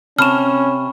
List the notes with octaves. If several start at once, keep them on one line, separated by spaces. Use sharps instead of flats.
C3 C#4 A5 B5 C#6 F6 E7